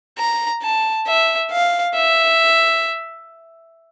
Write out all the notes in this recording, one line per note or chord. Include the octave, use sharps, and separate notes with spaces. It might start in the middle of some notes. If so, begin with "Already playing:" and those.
A#5
A5
E5
F5
E5